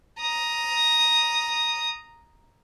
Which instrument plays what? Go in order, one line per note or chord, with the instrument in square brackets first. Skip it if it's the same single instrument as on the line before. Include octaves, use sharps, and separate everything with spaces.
[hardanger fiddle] A#5 D#6